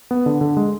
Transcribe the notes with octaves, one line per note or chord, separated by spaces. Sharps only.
B3
D3
D3
G#3